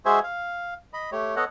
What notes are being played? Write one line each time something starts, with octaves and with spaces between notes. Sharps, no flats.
G#3 F#4 G#4 C5 E5 G#5
F5
D#5 B5
A3 G4 C#5
B3 A4 C#5 D#5 F#5